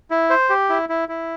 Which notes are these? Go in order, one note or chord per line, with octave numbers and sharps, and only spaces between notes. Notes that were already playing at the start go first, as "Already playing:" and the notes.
E4
C5
G4
E4
E4
E4